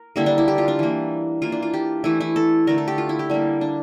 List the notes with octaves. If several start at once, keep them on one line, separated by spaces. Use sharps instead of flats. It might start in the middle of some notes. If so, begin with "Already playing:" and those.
Already playing: A#4
D3 G3 A#3 E4
D4
E4
G4
F4
D4
E3 A#3
E3 A#3 F4
D4
F4
G4
E3 A3 E4
E4
A4
D3 A3 A#4
A4
G4
F4
E4
G4
D3 G3 A#3
D4